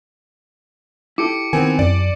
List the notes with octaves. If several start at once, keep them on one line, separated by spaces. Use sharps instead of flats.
E4 G4 A4 D6 C#7 D7
D#3 B3 C4 G#5
F#2 D5